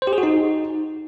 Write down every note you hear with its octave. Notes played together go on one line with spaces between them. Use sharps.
C5
G4
G#4
F#4
D#4